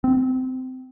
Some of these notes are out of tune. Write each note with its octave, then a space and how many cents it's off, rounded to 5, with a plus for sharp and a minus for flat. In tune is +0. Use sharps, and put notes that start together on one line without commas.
C4 -20